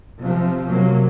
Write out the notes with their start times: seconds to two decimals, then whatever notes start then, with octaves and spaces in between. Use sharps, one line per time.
0.18 C3 F3
0.67 C3 F#3 A#3